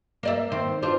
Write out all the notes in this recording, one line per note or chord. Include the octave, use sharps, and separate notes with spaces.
A#3 D5 E5
D#3 C4
D4 F4 C5